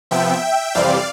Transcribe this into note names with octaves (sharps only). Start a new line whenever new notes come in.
C3 F3 B3 E5 G5
F2 C3 E3 G3 C4 D5 F5